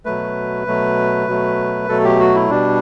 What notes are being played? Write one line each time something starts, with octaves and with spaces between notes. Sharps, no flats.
B2 F#3 A3 B4
B2 F#3 A3
B2 F#3 A3
B2 F#3 A3 A4
G4
F#4
E4
B2 G3 D4